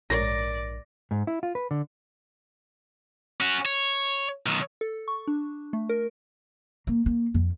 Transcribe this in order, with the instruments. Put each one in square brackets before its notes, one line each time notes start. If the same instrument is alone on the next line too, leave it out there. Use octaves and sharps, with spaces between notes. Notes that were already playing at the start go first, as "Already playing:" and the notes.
[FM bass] A#1 [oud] G#2 A#4 C#5 [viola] D5 [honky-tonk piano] A#6
[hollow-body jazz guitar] G#2
E4
F4
B4
D3
[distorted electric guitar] C#4 F#4
C#5
B1 D#3
[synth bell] A4
C#6
D4
A3
A#4
[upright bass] A#3
A#3
F2